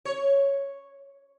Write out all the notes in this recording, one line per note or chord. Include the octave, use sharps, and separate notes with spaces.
C#5